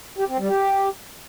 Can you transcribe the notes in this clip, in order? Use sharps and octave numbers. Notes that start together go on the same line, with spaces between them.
G4
C4
G3
G4